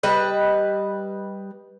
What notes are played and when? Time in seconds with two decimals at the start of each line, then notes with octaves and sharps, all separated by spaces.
0.03 G3 B4 D#5